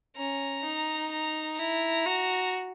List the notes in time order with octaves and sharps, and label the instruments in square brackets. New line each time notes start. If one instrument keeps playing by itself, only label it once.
[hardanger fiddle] C#4 [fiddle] A#5
[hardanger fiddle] D#4
[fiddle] A#5
[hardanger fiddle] E4 [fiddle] A#5
[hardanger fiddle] F#4